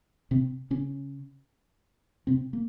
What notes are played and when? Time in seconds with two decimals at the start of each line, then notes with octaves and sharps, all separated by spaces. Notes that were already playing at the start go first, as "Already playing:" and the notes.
0.31 C3 C4
0.70 C#3 C#4
2.27 C3 C4
2.53 A#3